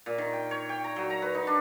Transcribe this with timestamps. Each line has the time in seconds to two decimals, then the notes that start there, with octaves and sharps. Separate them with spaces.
0.06 A#2
0.18 D#3
0.33 G5
0.51 C#5
0.69 G5
0.84 A#5
0.96 F#3
1.10 A#5
1.22 B4
1.35 D#4
1.47 D4